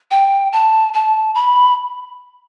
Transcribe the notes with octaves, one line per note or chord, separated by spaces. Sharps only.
G5
A5
A5
B5